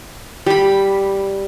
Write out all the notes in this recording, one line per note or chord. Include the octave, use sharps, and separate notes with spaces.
G3 B5